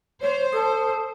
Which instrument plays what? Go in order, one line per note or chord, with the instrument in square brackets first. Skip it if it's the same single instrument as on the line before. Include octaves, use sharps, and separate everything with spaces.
[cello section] C5 [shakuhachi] C#5
[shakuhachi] A4 [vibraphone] A5 D#6